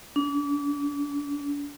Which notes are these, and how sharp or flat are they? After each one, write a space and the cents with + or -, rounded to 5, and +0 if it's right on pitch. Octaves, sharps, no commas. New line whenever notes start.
D4 -35